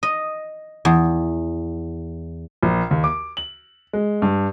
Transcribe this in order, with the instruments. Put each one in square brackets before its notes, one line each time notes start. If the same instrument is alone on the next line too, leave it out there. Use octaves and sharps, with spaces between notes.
[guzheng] D#5
E2
[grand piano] A#1
D#2
D6
F#7
G#3
G2